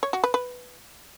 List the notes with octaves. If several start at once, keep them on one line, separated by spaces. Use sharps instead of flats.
C#5
F#4
B4
B4